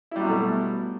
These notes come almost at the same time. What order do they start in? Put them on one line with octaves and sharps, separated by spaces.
E4 G3 F#3 B2 A3